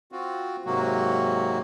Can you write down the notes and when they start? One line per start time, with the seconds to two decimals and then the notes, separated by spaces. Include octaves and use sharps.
0.12 C4 F4 F#4
0.66 G#2 C3 F#3 A#3 F#4